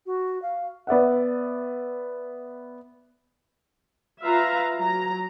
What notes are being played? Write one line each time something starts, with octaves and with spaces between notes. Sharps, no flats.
F#4
F5
B3 D5 E5 F#5
F4 B4 E5 F5 A#5
F#3 A#5